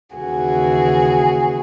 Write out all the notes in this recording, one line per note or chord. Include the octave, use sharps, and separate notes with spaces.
D#2 C#3 E3 F#4 G#4